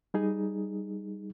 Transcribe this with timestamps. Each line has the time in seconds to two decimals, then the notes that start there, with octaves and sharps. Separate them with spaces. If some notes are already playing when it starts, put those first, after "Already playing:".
0.14 G3 D#4 G#4